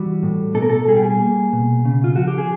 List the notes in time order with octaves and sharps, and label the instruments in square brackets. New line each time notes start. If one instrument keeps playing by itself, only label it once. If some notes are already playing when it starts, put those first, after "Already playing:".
Already playing: [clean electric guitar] E3 G3 F#4
A2
B2 A4
A#4
A4
G3 G#4
G4
G#4
A#3
B2
C#3
F4
F3 F#4
G4
G#4